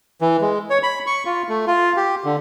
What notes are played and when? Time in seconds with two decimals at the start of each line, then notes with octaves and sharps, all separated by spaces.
0.21 E3
0.41 G#3
0.70 C#5
0.83 B5
1.07 C#6
1.26 F4
1.49 A3
1.67 F4
1.97 G4
2.24 D3